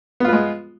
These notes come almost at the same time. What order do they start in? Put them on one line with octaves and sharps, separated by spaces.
B3 F4 B4 G#3